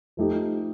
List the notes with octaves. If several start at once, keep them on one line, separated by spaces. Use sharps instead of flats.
F3 A3 D#4 G4